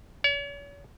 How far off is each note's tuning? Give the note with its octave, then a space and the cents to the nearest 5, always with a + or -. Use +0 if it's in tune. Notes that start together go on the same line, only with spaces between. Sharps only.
C#5 +40